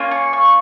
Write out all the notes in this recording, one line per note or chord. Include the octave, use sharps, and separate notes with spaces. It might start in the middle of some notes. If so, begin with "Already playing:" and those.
Already playing: A#3 C#4 F4
C#6
C#6